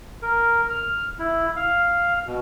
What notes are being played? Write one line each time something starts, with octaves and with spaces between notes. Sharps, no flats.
A#4
F6
E4
F5
B2